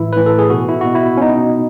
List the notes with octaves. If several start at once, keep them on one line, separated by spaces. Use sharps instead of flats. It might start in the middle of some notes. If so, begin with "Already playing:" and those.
Already playing: A2 E3 E4
A2 E3 B4
A4
G#4
B2 F#4
E4
B2 F#4
E4
C#4
B2 D#4